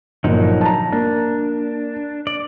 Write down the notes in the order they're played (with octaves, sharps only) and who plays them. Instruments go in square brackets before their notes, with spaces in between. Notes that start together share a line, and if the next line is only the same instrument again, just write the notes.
[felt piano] G1 A#2 [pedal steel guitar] F3 F#3 D#4
[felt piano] A5 A#5
[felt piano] A#3 [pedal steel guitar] D4
[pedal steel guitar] D5